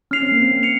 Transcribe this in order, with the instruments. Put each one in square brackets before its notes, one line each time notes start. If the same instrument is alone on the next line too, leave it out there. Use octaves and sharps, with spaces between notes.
[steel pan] C#4 [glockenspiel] F6 C7 F7
[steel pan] C4
A#3
C4
[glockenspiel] C#7 F7